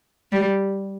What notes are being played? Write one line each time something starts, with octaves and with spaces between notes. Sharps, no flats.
G3